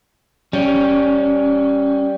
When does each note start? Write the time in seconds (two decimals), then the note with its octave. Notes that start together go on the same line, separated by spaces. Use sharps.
0.53 G3 C#4